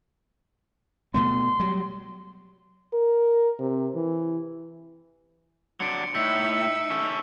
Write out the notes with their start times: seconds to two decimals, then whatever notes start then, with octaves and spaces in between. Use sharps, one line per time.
1.14 B2 A3 B3 C6
1.60 F#3 G3
2.93 A#4
3.59 C3
3.95 E3
5.80 F#3 D4 C6 C#7 D7
6.15 A2 D#4 E5 E6 B6 C#7
6.50 E6
6.90 C#4 A4